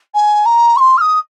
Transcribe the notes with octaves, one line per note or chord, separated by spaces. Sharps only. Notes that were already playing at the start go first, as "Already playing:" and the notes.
G#5
A#5
C#6
C6
F6
D#6